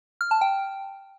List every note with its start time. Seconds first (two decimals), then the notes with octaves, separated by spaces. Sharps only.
0.21 F6
0.31 A5
0.41 G5